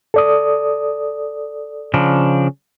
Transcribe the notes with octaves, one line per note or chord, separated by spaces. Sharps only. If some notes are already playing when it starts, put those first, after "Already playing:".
A4 D5 D#6
C#3 F3 D4